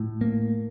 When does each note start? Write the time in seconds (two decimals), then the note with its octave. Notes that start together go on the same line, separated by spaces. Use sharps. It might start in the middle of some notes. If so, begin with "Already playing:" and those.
Already playing: A2
0.21 A#3